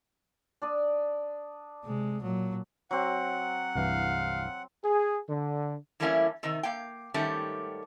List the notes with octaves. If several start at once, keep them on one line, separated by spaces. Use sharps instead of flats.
D4 D5 D#6
C3 G#3
A#2 F#3
F#3 C4 F#5
C2 G2 E3 F5
G#4
D3
E3 G3 A3 A#3 C#4 E4
C3 D#3 D#4
A#3 F5 G5
G#2 D#3 G3 A3 C#4 G4